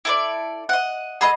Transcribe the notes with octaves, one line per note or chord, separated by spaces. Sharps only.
E4 A4 D5
D#5 E5 F#5
G#4 A4 D#5 F#5 B5 C#6